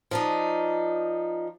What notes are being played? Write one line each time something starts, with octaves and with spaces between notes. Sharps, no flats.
F3 D4 D#4